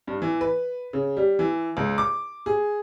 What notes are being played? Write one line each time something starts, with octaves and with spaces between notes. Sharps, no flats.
G2
E3
B4
C#3
G3
E3
C#2
D6
G#4